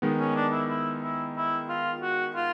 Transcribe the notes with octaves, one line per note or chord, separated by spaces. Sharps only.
D#3 G#3 B3
C#4
D4
E4
E4
E4
E4
F4
F#4
F4